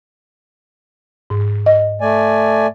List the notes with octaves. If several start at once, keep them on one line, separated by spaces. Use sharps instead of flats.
G#2
D#5
A3 D5 G#5